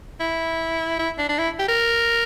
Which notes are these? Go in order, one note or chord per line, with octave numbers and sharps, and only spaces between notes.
E4
E4
D4
D4
E4
G4
A#4